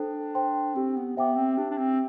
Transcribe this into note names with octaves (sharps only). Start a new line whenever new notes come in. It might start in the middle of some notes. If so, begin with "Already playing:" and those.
Already playing: D4 A4 C5 G5
C5 G5 C6
C4 G4
B3
B3 C5 E5 G5 D6
C4
D4 G4
D4
C4